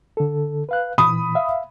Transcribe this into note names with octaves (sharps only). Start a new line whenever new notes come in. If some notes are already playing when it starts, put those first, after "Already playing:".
D3 A4
B4 F5 F#6
A#2 E3 B5 D#6
E5 F5